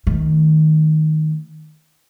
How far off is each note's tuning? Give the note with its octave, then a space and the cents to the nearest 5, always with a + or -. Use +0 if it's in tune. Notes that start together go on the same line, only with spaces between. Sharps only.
D#3 +0 A3 +0